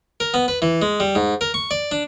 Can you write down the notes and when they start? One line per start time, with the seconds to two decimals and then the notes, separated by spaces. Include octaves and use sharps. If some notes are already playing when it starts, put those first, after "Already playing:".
0.20 A#4
0.34 B3
0.48 B4
0.62 E3
0.82 G#3
1.00 G3
1.15 G#2
1.41 A#4
1.54 C#6
1.71 D5
1.92 D4